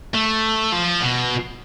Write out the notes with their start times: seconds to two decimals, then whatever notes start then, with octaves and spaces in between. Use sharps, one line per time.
0.14 A3
0.72 F3
1.02 B2